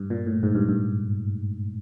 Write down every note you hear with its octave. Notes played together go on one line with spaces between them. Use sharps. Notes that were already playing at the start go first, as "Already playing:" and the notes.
Already playing: G2
A#2
A2
G#2
G2
G2